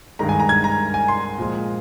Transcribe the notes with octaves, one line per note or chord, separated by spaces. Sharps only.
G2 D#3 G#3 A#5
G#5
A#5
G#6
A#5
G#5
C6
A#2 F3 G#3